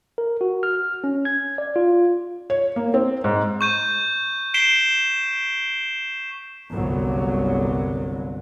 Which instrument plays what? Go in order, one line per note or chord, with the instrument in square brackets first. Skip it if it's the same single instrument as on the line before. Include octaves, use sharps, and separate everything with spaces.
[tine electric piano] A#4
F#4
F6
C#4
G#6
D5
F4
[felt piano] C#5
A#3
C4
G#2
[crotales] C#6 G6 D#7
B6 C7 D7 E7 G7
[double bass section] G1 C2 F#3